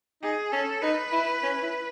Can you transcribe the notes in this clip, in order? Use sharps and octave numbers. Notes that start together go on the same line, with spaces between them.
D#4 G#4
C#4 A4
D#4 B4
E4
C#4
E4